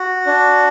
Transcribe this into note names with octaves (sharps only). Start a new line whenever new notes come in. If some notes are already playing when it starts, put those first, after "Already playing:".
Already playing: F#4
D4